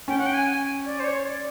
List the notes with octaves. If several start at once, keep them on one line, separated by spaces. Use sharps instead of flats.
C#4 G5
F#5
G5
G#5
D5
C5
C#5
D5